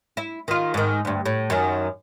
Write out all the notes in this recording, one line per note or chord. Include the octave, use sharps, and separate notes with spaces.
E4
D#3 F4
G#2 D#3
D2 G2
A2
F#2 D#3